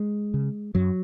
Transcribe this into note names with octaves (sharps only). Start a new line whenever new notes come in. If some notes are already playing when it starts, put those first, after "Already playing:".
Already playing: G#3
C#3
F#2 F#3